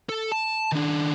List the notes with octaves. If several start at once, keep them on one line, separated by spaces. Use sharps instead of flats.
A4
A5
D#3 D4